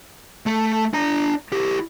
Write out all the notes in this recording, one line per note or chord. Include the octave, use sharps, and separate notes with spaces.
A3 A4
D4 A#5
E4 G4